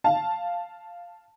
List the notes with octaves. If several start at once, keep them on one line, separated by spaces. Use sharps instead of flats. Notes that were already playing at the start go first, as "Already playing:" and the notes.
F5 A5